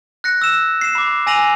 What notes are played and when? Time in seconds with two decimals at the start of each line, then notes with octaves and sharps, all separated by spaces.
0.24 F#6 A#6 C#7
0.42 E6 E7
0.81 C7 E7
0.95 B5 D6
1.27 G#5 E6 A#6 D#7 F7 F#7